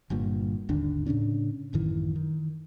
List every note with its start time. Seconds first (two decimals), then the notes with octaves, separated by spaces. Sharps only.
0.10 G1 G2 A#2
0.69 G#1 D#2 D3 D4
1.06 A2 C#3 C#4 D4
1.73 A1 F#2 D#3 E3
2.16 D#3